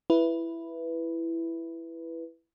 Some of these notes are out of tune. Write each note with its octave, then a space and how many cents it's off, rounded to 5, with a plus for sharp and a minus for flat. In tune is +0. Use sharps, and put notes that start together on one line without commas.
E4 +10 B4 +0